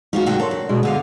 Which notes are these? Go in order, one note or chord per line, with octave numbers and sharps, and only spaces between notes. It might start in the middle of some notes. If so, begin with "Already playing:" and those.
G#3 C#4 D#4 F4 F#4
A#2 D3 F#4 G5
A4 A#4 C#5 C6
A#2
B2 G#3 D4
D3 B3 E5 F5